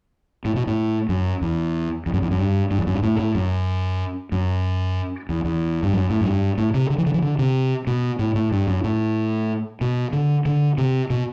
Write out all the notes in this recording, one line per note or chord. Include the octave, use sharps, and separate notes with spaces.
A2
B2
A2
F#2
E2
E2
F#2
E2
F#2
G2
G2
E2
F#2
G2
A2
A2
F#2
F#2
E2
E2
G2
F#2
A2
F#2
G2
A2
C3
D3
E3
D3
E3
D3
C3
B2
A2
A2
G2
F#2
A2
B2
D3
D3
C3
B2